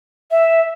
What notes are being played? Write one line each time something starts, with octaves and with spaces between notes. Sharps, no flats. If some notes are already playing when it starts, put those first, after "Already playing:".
E5